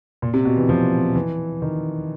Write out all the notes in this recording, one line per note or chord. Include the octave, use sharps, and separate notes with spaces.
A#2
C3
B2
E3
F3
E3
D#3